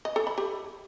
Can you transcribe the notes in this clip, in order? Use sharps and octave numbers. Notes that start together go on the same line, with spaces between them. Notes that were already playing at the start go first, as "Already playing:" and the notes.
D#5
A4
B5
G4